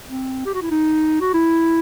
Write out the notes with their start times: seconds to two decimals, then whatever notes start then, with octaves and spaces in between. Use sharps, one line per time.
0.09 C4
0.46 G4
0.54 F#4
0.62 E4
0.71 D#4
1.21 F#4
1.34 E4